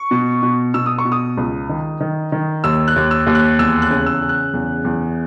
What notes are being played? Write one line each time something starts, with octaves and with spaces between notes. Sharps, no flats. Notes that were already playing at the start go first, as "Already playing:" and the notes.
Already playing: C#6
B2
B2
B2 E6
D#6
C#6
B2
D#6
C#2
D#3
D#3
D#3
D#2 E6
F#6
D#2
E6
D#2
F#6
E2 E6
F#6
C#3
E6
C#3
F#6
E2
E2